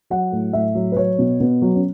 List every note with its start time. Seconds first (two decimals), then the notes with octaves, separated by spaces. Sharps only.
0.10 F#3 F#5
0.32 A2
0.53 A2 E5
0.75 F#3
0.92 B4
0.96 F#3 C#5
1.19 B2
1.40 B2 B3
1.62 F#3
1.75 C#4